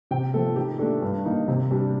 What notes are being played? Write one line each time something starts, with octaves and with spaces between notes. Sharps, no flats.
C3 G5
F3 A3 A4
D#3 G4
A3 D4 A4
G2
D#3 A#3 D#4
C3
G3 D4